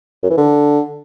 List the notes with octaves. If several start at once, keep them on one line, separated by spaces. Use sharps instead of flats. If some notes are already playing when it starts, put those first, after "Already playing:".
F#2
E3
D3